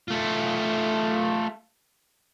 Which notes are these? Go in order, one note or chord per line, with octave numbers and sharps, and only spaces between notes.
A3 F4